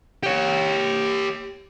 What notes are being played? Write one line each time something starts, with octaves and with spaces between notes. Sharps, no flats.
G4 C#5